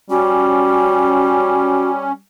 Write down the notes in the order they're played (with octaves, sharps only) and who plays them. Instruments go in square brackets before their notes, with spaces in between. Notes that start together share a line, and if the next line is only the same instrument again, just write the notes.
[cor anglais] G3 [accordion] C#4 [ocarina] F#4